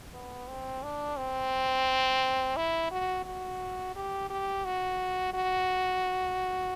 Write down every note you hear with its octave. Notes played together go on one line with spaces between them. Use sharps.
B3
C4
D4
C4
E4
F#4
F#4
G4
G4
F#4
F#4